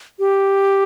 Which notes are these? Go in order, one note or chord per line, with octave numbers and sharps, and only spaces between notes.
G4